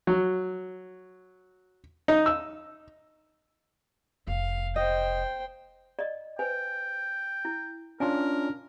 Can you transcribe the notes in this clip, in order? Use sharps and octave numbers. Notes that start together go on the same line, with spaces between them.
F#3
D#4
E6
F1 F5
C5 D#5 G5
D5 D#5
B4 C5 G5 G#5
E4
C#4 D4 F4 A#4 G#5